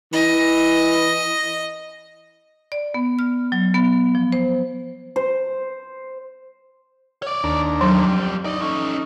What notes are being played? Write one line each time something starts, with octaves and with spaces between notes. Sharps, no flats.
E3 D#5
D5
B3
F6
F#3
B3
F3
C5
C5
C#5 D5
D#2 D4 A#5
F2 F#3 G3
D#4 D5 D#5
C#4 D#4 A4